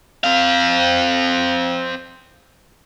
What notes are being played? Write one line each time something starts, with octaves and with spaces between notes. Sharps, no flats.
C4 F5